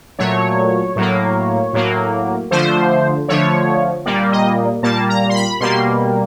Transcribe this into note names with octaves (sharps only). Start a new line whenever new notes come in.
A#2 F#3 A3 C#5
A2 F#3 A#3
A2 F#3 A#3
D3 F3 A3 C5
D3 F3 A3 C#5
A#2 G3 A#3 D5
D#5
A#2 G3 A#3 A5
A#5
C6
B5
B2 G3 A#3 C6